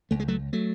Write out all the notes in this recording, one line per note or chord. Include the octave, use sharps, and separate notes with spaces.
C#2 A3
G#3
F#3 A3
F#3 A3